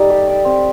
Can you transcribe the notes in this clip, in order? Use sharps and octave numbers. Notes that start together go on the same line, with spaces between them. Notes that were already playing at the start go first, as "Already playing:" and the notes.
Already playing: G3 D#4 A4 D5
G4
D5
C4